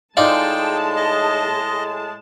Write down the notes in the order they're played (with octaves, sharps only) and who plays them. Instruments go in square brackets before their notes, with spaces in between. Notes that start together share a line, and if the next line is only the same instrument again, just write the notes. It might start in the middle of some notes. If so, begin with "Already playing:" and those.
[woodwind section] A2 G#3 [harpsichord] D#4 F4 D5 [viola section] G#4 A5 [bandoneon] G5
[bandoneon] D#5